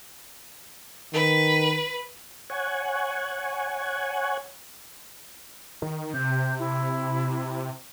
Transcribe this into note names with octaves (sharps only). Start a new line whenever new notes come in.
D#3 B4
C#5 F#5 G#5
D#3
C3 G6
E4